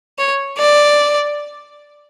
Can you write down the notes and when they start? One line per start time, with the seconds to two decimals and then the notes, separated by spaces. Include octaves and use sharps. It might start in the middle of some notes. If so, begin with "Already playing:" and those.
0.18 C#5
0.58 D5